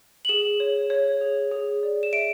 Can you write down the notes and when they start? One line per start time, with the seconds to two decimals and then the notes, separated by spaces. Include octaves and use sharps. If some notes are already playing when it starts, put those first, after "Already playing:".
0.25 F#7
0.29 G#4 E7
0.60 C#5
0.90 C#5
1.21 G#4
1.51 G#4
1.83 D5
2.03 E7
2.13 E5 D7